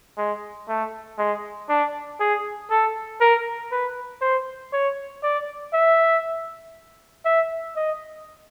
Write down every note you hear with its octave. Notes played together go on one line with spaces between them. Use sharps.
G#3
A3
G#3
D4
G#4
A4
A#4
B4
C5
C#5
D5
E5
E5
D#5